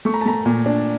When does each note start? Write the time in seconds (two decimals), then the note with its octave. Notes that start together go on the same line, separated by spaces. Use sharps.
0.05 A3 C#6
0.14 A#5
0.21 A5
0.26 A3 A#5
0.46 A#2
0.66 D4